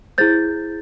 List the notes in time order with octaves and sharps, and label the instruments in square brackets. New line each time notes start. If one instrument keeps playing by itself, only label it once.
[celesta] E4 G#4 C5 G6 A6